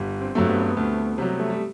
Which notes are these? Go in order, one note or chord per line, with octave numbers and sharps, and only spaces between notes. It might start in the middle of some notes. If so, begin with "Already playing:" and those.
Already playing: G1 G3
C4
G2 F#3 A3 C4
B3
C4
B3
D2 A3
C3 F#3 G3
A3
G3